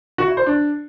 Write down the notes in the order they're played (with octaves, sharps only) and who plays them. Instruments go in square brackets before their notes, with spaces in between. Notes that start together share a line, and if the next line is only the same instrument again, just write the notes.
[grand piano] F#4
E4
C5
D4